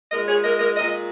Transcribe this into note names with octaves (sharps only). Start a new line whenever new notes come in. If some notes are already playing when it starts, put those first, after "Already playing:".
A#2 G#3 A#4 D#5
G#4 C#5
A#4 D#5
A#4 D#5
A#2 G#3 A#4 D#5